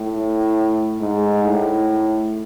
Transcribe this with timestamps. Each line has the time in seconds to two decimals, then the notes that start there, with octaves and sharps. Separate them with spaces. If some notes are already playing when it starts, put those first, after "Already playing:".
Already playing: A2
1.00 G#2
1.45 A2